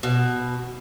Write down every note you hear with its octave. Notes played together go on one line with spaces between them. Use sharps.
B2